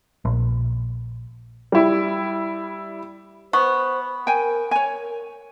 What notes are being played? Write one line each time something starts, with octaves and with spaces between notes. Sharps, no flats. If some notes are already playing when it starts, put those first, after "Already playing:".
A#1
G3 E4
B3 C5 C#6
A#4 G5 G#5
C#5 G#5